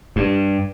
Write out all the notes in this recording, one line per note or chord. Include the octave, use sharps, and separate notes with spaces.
G2